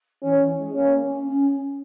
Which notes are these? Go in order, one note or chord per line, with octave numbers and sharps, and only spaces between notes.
E3 C#4
E3
G#3
A#3 C#4
C#4
C#4